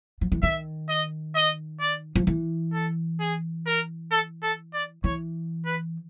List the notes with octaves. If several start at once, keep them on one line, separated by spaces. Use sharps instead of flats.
F3
E3
D#3 E5
D#5
D#5
D5
F3
E3
A4
G#4
A#4
A4
A4
D5
E3 C#5
B4